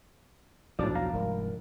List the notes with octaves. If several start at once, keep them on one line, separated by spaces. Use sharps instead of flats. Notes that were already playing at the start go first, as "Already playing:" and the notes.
B1 E2 A2 F3 D4 F#4 D5
F5 A#5
F1 G#2 G3 A#4